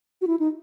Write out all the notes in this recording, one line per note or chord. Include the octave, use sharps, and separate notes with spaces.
F#4
E4
D#4